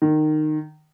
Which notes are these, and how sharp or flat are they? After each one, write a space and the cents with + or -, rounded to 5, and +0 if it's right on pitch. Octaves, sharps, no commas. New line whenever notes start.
D#3 -20